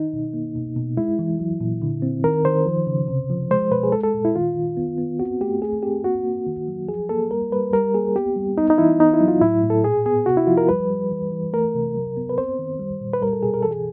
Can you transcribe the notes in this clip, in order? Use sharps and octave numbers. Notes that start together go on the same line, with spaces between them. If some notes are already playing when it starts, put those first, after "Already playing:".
Already playing: D#3 D#4
B2
A#3
B2
B2
G#3 E4
E3
F#3
A#2
D3
C4
D#3 A#4
D#3 C5
F3
C#3
C3
F3
G#3 C5
B2 B4
G#4
G#3 A4
A4
A#2
E4
D#3 F4
D#3
B3
B3
C4 F#4
A3 G4
A3 G#4
C4 G4
A#3 F#4
A#3
D#3
F#3
F3 G#4
A#3 A4
G3 A#4
G3 B4
G3 A#4
A#3 G#4
B3 G4
G3
B3 D#4
D#4
E3 E4
B3 D#4
E4
F#3
F4
A2 E4
A2
A4
A#2 G#4
B3 G#4
C3 F#4
E4
F3 F4
A#4
G3 B4
G3
E3
E3
A3 A#4
C3
F#3
B3
B4
C4 C5
D#3
G3
A#2
B4
G3 A#4
A4
B2 G#4
A#4
E3 A4
G#4